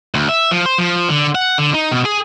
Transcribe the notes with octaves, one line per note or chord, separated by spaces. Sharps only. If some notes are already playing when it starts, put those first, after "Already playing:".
D2
E5
F3
C5
F3
D3
F#5
D3
D#4
B2
G#4